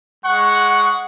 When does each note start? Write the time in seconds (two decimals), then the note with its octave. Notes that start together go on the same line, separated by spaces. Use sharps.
0.25 G#3 F#5 C#6